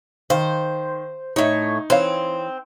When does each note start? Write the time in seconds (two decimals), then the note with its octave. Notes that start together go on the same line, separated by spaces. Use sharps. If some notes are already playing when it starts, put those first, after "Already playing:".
0.30 D#3 C5 F5
1.36 A2 D#4 C#5
1.90 E3 C4 C#5 F5